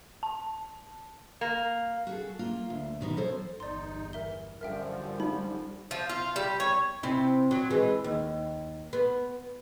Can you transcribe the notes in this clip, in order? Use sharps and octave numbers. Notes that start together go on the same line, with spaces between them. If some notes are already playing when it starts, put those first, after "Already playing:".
A5
A#3
F#4 G#4 A4
A#3 F4
D2
B2 D#3 B3 F#4
F3 A4 C5 C#5
G1 E2 D#4 D5 C6
E3 A#4 E5 G7
F#2 D3 F3 G3 A#4 E5 G5
D#4 B5
F3
F4
G3
C#5
C3 C4 E4
F#3
E3 G#3
D#2
B3